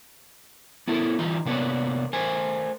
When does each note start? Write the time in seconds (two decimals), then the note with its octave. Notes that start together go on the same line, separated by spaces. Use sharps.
0.88 B3 E4 A4 A#4
1.19 E3 G3 D#4 F4
1.45 C3 A#3 B3 D4 C#5
2.13 A3 A#4 C5 G#5